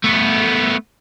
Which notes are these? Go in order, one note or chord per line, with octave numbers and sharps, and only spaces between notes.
A3 B3